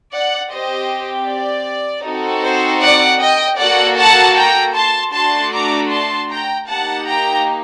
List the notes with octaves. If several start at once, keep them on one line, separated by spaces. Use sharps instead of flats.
D5 F#5
C4 G4 C5 D#5
D5
C4 D#4 F#4 A4
C5
D5 F#5
D#5 G5
A#3 F#4 A4 D5 F#5
F#5 A5
G5 A#5
A5 C6
A3 D4 F#4 A5 C6
A#5 D6
A5 C6
G5 A#5
A#3 D#4 G4 F#5 A5
G5 A#5